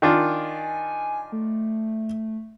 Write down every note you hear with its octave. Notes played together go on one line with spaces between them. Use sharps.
D#3 D4 F4 G#5
A3